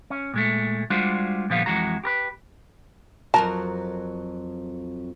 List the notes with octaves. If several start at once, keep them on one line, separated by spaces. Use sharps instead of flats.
C#4
A#2 G#3 A3
G3 G#3 D4 F4 F#4 C5
A#2 D3 F3 G3 B3 F5
F2 E3 G#3 F#4 A#5
G4 A#4 B4
F2 F#3 A#4 A5